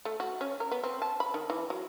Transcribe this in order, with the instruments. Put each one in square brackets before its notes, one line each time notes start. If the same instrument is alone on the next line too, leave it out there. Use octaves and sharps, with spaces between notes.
[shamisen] A3
F#4
C#4
A#4
B3
C4
A5
B5
D#3
E3
F#3